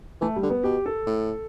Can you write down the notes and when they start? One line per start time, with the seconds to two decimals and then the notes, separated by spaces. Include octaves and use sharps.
0.21 E3 A3
0.36 G3
0.43 D3
0.50 B3
0.64 B2 G4
0.86 A4
1.07 A2